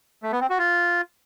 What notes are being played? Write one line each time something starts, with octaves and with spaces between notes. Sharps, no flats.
A3
B3
C4
F#4
F4